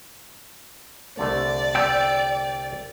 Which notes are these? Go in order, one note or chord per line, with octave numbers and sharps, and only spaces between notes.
C2 D3 A3 D5
G5 E6 G6